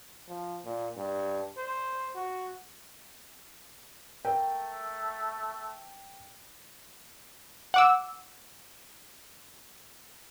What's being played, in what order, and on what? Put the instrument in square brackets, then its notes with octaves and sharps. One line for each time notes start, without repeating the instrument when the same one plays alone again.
[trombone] F3
A#2
G2
C5
F#4
[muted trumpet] A3 [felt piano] A#4 G5
[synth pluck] F#5 D6 E6